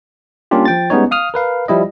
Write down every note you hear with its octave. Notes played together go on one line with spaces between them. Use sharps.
G3 A#3 C#4 D4 F4 G4
F3 G5 A6
G3 G#3 B3 C#4 D#4 C#5
F5 D#6 F6
A#4 B4 F5
F3 G3 E4 D#5